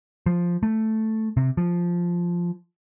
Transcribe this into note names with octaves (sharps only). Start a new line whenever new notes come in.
F3
A3
C3
F3